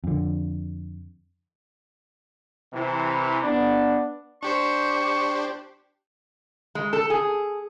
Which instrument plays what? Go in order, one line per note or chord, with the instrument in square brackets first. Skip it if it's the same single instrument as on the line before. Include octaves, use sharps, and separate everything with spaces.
[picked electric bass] F2 D3
[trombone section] C3 E3
B3 D4
[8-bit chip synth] D4 G4 C5 [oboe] C#6
[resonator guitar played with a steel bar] G#3
A4
G#4